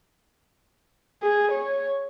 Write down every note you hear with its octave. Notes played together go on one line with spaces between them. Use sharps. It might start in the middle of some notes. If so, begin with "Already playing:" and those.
G#4
C#5